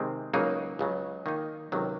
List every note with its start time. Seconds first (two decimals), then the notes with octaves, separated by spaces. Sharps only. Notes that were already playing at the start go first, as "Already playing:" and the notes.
Already playing: C3 D#3 G#3 C4
0.34 C#2 C#3 F#3 A#3 D#4
0.79 C#2 C#3 F#3
1.26 D#3 A#3 D#4
1.72 C#2 C3 D#3 F#3